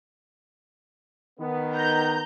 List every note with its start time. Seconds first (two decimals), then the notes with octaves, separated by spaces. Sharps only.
1.40 D#3 B3
1.72 A#5 G6